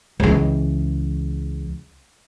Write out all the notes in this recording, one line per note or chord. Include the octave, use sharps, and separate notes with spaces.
C#2 E3